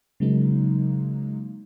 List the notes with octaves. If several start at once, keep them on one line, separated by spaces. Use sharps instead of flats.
C#3 F#3 G#3 A#3 D#4